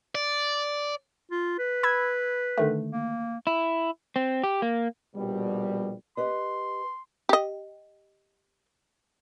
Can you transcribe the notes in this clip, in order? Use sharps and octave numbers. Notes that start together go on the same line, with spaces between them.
D5
F4
B4
B5 E6 G#6
D3 D#3 A3
A#3
E4
C4
G4
A#3
A#1 B2 G3
G4 B4 D#5 C6
G4 D#5